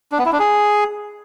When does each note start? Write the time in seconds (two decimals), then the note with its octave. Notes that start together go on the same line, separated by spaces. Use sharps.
0.12 D4
0.19 B3
0.26 E4
0.32 D4
0.39 G#4